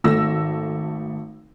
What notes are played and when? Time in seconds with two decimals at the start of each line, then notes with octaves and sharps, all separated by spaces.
0.04 G#1 A3 E6 A#6